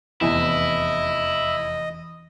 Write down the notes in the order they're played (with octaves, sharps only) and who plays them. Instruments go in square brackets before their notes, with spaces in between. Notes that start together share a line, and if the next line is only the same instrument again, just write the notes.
[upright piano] F1 E2 G#5 [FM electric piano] E3 [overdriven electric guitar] E4 [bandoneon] D#5